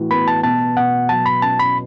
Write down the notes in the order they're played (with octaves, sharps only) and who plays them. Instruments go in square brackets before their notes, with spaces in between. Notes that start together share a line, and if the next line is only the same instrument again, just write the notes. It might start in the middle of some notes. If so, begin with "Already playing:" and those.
Already playing: [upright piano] A2 E3 F#4
[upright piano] B3 [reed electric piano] B5
[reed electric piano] A5
[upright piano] B2 [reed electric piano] A5
[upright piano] B2 [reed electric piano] F#5
[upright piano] F#3 [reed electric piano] A5
[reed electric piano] B5
[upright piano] C#4 [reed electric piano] A5
[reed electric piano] B5